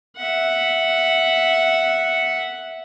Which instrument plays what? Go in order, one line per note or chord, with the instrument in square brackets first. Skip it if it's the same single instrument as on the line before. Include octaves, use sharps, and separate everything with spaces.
[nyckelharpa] E5 F#5